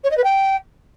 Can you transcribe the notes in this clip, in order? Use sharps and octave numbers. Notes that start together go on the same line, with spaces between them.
C#5
D#5
B4
G5